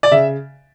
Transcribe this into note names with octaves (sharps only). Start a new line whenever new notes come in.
D5
C#3 E5